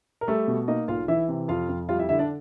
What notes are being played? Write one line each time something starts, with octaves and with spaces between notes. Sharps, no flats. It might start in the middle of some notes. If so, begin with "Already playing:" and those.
A#4
G3 A3 A4
B2
A#3 D#4 D#5
B1 F4 F5
E3 E4 E5
C3
F2 F4 F5
F2
G3 F4 F5
E4 E5
D3 E4 E5
D4 D5